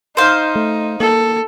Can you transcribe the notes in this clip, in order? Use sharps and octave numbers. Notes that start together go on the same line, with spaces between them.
D#4 C5 F5
A3
A#3 A4